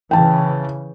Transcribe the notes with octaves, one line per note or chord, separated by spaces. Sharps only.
C#3 E3 G5 A5